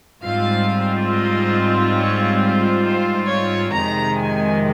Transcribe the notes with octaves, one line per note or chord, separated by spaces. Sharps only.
G#2 G3 C4 F4 F5
D#5
C#5
C5
C5
C#5
F2 C3 D#3 G#3 A#5
G#5